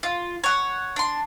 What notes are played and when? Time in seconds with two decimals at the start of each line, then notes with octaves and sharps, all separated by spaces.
0.03 F4
0.44 C#5 F#5
0.96 D4 C6